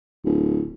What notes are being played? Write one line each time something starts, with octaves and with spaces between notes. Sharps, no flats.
D1